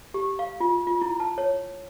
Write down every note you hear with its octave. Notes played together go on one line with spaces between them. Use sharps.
G4
F5
F4
F4
E4
A5
C#5